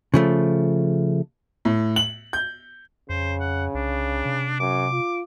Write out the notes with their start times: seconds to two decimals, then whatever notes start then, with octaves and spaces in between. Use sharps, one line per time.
0.14 C#3 F3 A3
1.65 A2
1.96 F#7
2.33 G6
3.10 F2 C#3 C5
3.40 F#5
3.74 C2 D4
4.25 C3
4.60 F#2 D6
4.92 F4